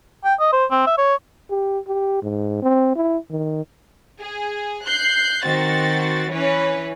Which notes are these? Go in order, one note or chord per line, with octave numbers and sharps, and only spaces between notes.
G5
D#5
C5
C4
E5
C#5
G4
G4
G#2
C4
E4
D#3
G#4
F#6 G6 C7
D#3 C4 F#4 A6
E3 C#4 B4 C#5